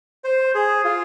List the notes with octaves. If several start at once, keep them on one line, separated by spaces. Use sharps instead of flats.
C5
G#4
F4